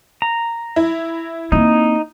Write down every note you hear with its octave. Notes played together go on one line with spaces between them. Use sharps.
A#5
E4
A#3 C4 D#4